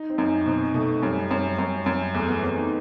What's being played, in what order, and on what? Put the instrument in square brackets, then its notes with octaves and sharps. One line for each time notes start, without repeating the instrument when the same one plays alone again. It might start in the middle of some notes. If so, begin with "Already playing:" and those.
Already playing: [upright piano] D#4
C4
[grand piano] F#2 [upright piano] D#4
[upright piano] D#4
[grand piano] B2 [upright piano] C4
[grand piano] B2 [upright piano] A3
[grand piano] F#2 [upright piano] G3
[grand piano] F#2
F#2
F#2
[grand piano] E2 [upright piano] A3
[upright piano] B3
[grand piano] E2 [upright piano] C4
[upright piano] D#4